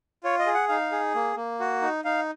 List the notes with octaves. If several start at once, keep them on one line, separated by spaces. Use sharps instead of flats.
F4 C#5
D#5
G#4
F#5
D#4 F5
G#4
A#3
A#3
F#4
D#4
D#4 F5